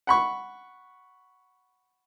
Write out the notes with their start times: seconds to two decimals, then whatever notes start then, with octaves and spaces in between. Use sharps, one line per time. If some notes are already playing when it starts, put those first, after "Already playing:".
0.07 F#5 B5 C#6